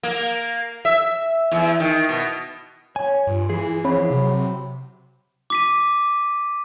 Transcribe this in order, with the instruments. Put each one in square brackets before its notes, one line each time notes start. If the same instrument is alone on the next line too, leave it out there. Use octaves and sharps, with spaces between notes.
[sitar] A#3
E5
E2
D#3
B2
[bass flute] C#5 [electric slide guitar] G#5
[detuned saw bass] G2 [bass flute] F4
[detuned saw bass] E3 [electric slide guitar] G#4
[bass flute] F3 [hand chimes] C4 C#5 B5
[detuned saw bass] C3 [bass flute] F#3
[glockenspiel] D6 B6 D#7